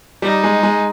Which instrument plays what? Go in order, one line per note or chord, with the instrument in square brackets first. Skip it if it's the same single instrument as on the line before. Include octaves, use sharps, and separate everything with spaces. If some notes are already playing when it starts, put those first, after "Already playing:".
[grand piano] G3 [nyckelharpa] D#4
[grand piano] G#3
G#3